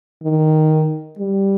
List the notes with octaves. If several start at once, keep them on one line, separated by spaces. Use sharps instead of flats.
D#3
G3